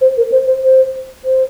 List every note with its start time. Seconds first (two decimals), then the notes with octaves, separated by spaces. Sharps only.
0.01 C5
0.17 A#4
0.32 C5
0.47 C5
0.63 C5
1.24 C5